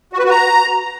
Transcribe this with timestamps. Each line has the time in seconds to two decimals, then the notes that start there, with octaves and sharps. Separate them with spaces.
0.13 F#4
0.19 B4
0.25 F#4
0.30 A#5